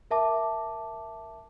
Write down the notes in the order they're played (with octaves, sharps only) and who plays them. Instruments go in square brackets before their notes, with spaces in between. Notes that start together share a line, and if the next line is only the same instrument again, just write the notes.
[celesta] A#4 E5 A5 D6